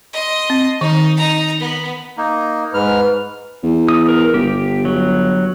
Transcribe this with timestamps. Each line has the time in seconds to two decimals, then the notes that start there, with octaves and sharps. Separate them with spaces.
0.13 D#5 C6
0.50 C4
0.81 D#3 D#4
1.17 D#4 A#5
1.60 B3
2.18 A#3 D#4
2.74 G#2 B4 F6
3.63 E2
3.88 D#6
4.09 A#4
4.34 G1 G4
4.85 F#3